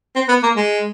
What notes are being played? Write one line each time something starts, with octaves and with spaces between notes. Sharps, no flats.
C4
B3
A#3
G#3